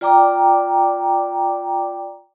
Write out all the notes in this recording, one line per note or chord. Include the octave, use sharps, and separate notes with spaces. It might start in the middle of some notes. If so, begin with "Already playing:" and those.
F4 D5 G5 A#5 D6